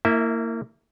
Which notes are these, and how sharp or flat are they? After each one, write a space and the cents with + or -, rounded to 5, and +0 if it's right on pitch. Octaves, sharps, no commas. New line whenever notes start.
A#3 -25 E4 +0 E5 -30